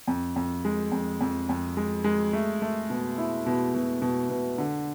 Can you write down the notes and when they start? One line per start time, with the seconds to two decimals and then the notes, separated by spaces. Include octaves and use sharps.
0.08 F2
0.36 F2
0.65 G#3
0.92 F2
1.21 F2
1.49 F2
1.77 G#3
2.04 G#3
2.33 A3
2.62 A3
2.90 B2
3.18 E4
3.46 B2
3.74 B2
4.02 B2
4.30 B2
4.58 D3